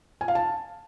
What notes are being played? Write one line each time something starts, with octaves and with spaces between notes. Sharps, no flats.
G#5
F5
A5